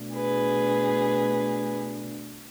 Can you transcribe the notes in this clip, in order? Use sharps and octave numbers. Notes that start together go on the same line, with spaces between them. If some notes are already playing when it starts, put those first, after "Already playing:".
Already playing: B2 A3 D4
G#4 B4